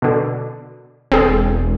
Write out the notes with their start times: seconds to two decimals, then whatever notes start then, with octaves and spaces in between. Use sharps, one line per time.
0.02 B2 D3
1.12 E1 C4 G#4 A4